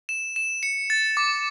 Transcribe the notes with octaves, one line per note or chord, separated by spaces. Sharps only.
E7
E7
C#7
A6
D6